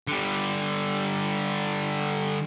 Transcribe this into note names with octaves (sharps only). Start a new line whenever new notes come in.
D3 G3